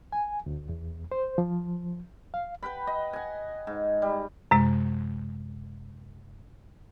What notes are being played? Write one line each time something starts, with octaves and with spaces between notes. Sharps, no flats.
G#5
D2
E2
C5
F3
F5
B4 F#5 G5 B5
D#5
F#5 G#5
G#2
G3
F#2 C3 G#3